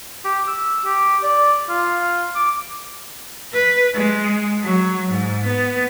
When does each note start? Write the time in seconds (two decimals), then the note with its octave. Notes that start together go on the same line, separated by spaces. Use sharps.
0.25 G4
0.47 E6
0.85 G4
1.23 D5
1.69 F4
2.35 D6
3.53 B4
3.94 G#3
4.63 F#3
5.11 G#2
5.46 B3